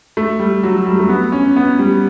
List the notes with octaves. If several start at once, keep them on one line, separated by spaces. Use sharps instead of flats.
A3
G3
F#3
G3
A3
B3
C#4
B3
G3